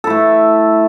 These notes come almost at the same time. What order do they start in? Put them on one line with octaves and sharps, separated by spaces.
A4 E4 A3